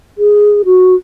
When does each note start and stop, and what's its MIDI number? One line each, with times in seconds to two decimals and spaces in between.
0.18 0.62 68
0.65 0.95 66